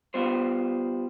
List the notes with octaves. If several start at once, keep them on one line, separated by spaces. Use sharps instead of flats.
G3 B3 F4 C5